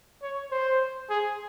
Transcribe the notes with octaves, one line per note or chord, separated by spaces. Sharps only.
C#5
C5
G#4